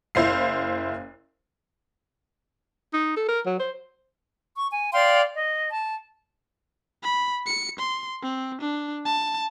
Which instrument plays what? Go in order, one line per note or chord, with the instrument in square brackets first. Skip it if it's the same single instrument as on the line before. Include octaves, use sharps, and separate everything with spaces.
[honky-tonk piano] F#1 E4 C5 F5 C7
[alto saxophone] D#4
A4
A#4
F#3
C5
[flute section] C#6
G#5
D5 F5 G5 C6
D#5
A5
[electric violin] B5
C#7
C6
C4
D4
A5